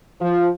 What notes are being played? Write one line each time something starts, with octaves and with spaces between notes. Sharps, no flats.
F3